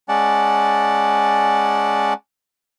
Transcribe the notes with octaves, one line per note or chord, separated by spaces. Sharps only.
G#3 C#4 D5 F#5 A5